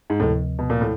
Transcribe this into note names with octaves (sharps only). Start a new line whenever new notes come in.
G#2
D2 A2 C3 F3
B2
A#2
A2